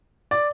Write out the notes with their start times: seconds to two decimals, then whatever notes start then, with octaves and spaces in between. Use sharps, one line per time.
0.31 D5